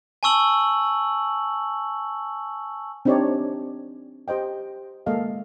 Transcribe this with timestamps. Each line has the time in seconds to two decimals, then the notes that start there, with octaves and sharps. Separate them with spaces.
0.23 G#5 A5 C#6 E6 F#7
3.05 C4 D4 D#4 G4 C#5 D5
4.28 G4 C5 D#5 G5
5.06 G#3 A#3 A4 D#5 F5